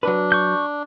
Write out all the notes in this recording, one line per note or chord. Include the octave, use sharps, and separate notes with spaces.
F#3 D4 B4
C#6 G6